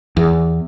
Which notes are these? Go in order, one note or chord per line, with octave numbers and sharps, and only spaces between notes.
E2